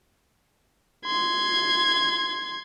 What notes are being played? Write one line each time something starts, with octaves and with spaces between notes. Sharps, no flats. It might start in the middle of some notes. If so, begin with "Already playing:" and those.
C6 G#6